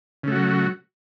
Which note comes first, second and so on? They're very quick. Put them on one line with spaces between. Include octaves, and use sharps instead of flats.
C#3 A3 F#4 F#3